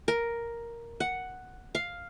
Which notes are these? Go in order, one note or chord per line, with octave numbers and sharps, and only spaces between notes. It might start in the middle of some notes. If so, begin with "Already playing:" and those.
A#4
F#5
F5